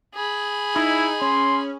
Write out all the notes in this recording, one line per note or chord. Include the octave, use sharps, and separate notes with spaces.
G#4 B5
D#4 E4
C#4 C6